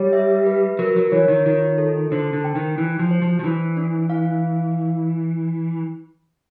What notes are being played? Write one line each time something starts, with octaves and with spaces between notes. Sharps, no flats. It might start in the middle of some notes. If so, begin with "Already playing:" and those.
Already playing: G3 C#5
E5
B4
F#3 A#4
F#3
E3 C#5
D#3
D#3 F4
A4
D3 C5
D3
G5
D#3
E3 D4
F3
C5
F3
F3
E3 D4
D4
F5